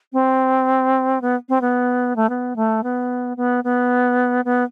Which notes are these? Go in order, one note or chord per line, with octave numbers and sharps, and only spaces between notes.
C4
B3
C4
B3
A3
B3
A3
B3
B3
B3
B3